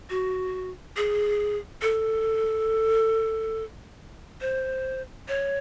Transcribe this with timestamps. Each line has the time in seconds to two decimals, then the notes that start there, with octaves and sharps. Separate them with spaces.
0.10 F#4
0.97 G#4
1.82 A4
4.41 C5
5.28 C#5